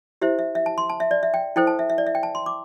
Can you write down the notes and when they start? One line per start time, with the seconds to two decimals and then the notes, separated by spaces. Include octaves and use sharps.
0.22 E4 G4 C5 E5
0.39 E5
0.55 E5
0.66 A5
0.78 C6
0.89 A5
1.00 E5
1.11 D5
1.23 E5
1.34 G5
1.56 E4 A4 C5 G5
1.67 A5
1.79 E5
1.90 E5
1.98 D5
2.07 E5
2.15 G5
2.23 A5
2.35 C6
2.46 D6